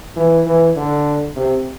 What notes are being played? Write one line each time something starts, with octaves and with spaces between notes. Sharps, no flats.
E3
E3
D3
C3